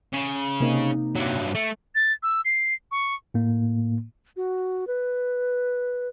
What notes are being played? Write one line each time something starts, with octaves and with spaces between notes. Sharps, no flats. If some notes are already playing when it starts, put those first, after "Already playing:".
C#3
C3 A#3 D#4
G2 F#3
A3
A6
E6
C7
C#6
A2 A#3
F#4
B4